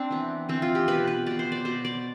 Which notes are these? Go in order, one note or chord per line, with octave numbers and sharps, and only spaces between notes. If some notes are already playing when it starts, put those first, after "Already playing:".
Already playing: C4 D4
E3 B3
E3 B3 C4
F4
G4
B2 B3 B4
B4
B2 B3 D5
C5
D5
B2 B3 C5
D5